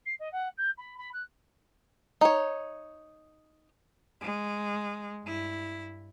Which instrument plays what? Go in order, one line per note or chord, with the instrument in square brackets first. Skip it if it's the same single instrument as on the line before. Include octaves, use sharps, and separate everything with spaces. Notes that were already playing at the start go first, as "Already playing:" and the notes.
[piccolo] C7
D#5
F#5
G6
B5
B5
F#6
[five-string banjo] D#4 C#5
[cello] G#3
G2 E4